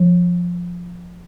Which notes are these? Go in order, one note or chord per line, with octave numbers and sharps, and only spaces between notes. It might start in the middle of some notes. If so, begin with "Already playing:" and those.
Already playing: F3